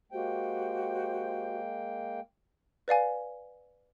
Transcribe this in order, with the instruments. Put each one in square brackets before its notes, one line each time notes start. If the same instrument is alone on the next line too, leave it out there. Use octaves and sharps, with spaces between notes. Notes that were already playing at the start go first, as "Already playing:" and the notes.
[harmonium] G#3 A#3 G5 [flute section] F#4 G4 C5
[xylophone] B4 D5 F5 G#5